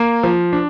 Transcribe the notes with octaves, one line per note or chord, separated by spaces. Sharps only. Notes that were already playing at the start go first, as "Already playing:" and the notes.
Already playing: A#3
F3
D4